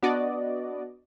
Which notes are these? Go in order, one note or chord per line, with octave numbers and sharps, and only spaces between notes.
B3 D4 F#4 D5 D#5